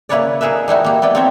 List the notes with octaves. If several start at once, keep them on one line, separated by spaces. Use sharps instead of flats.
C#3 A#3 E4 B4 C#5 D5
D#4 G#4 A#4 B4 E5
G3 D#4 E4 F#4
A#3 G4
B3 E4 D5 G5
C4 D#4 F4 C#5 E5 G5